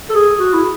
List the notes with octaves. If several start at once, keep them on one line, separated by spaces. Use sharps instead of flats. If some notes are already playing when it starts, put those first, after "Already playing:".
A4
G#4
F#4
E4